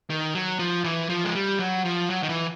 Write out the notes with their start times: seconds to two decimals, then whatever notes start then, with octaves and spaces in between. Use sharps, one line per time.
0.10 D#3
0.35 F#3
0.59 F3
0.84 E3
1.09 F3
1.25 G#3
1.35 G3
1.59 F#3
1.85 F3
2.10 F#3
2.23 D#3
2.29 E3